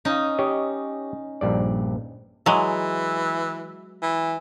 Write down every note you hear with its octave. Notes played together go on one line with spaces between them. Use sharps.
C#4 D#4
G4 C#5 D#5
A#1 G2 D5
E3 F#3 G#3
E3